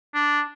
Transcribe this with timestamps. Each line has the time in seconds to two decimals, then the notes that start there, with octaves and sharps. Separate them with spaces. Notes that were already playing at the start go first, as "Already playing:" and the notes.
0.14 D4